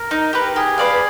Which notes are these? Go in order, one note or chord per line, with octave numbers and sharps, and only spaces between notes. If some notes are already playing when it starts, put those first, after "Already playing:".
Already playing: A#4
D#4
G4 B4
G4 G#4
B4 D5 F5